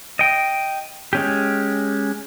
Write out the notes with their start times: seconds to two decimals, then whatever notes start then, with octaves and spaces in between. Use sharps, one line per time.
0.19 D#5 G5
1.13 G#3 C#4 G4